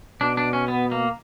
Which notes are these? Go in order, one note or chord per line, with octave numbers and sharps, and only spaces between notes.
B2 D4
D4
C#4
B3
A#3